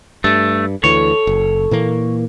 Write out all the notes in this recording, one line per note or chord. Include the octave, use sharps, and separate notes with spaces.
G2 A3
D2 E3 A4 C#5
F#1
A#2 E3 A#3